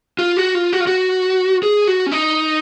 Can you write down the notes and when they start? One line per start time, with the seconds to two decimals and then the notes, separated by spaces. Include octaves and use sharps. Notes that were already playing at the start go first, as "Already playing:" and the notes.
0.19 F4
0.37 F#4
0.55 F4
0.73 F#4
0.80 F4
0.87 F#4
1.63 G#4
1.87 F#4
2.06 C#4
2.11 D#4